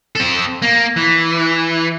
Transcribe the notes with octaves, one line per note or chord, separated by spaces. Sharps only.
C4 A4
A#3
E3